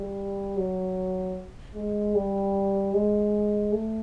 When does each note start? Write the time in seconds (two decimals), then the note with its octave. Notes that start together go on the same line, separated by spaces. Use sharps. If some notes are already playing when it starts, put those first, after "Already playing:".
Already playing: G3
0.57 F#3
1.75 G#3
2.15 G3
2.94 G#3
3.72 A3